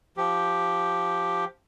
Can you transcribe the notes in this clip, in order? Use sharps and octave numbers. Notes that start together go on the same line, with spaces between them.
F3 G4